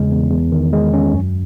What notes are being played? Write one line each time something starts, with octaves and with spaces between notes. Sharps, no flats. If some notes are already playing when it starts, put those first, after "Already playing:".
Already playing: E2 C#3 G#3
E2
E2
D#3
G#3
C#4
F#2